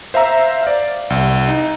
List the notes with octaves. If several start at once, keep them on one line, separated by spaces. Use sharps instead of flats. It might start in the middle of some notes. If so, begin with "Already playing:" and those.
C5 E5 F5 A#5 E6
D5 F5
C2
D#4